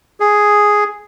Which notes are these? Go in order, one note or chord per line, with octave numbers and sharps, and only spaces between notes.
G#4